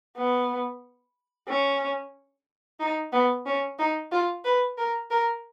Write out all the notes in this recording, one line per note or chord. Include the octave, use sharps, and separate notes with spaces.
B3
C#4
D#4
B3
C#4
D#4
F4
B4
A#4
A#4